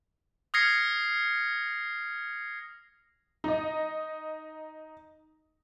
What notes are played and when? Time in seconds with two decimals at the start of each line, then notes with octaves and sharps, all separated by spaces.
0.54 D#6 F6 G#6 A#6 C7 C#7
3.44 D#4 D#5